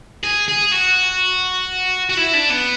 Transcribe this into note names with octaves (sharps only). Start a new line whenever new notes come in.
G#4
G#4
F#4
F#4
E4
D4
B3